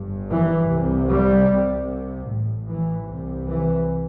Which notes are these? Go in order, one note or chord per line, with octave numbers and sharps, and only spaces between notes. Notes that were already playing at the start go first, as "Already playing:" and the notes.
Already playing: G1 G2
E3
C2 C3
G3
C2 C3
A1 A2
E3
C2 C3
E3